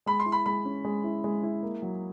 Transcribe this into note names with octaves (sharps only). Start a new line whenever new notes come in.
G#3 B5
C6
E4
B5
G#3 B5
C#4
G#3
E4
G#3
E4
A#3
F#3